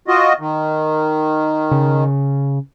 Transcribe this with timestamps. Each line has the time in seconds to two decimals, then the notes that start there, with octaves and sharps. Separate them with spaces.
0.08 F4 F#4 D#5
0.40 D#3
1.71 C#3